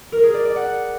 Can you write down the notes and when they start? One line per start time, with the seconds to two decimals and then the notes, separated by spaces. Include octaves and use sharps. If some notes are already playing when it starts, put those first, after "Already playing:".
0.12 A#4
0.23 G#4
0.34 D5
0.45 D5
0.56 F#5